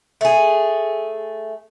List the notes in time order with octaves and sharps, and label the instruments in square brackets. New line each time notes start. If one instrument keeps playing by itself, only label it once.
[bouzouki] A3 G#4